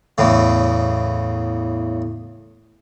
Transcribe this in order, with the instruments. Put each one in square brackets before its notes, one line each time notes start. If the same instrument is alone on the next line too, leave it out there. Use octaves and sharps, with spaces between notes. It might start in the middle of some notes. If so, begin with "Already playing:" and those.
[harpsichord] E2 A2 C#3